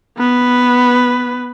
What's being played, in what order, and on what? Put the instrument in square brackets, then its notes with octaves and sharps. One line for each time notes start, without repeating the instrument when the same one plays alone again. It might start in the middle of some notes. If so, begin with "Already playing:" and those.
[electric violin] B3 B4